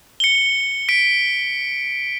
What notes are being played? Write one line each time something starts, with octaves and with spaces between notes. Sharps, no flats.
C#7 G7
B6 D7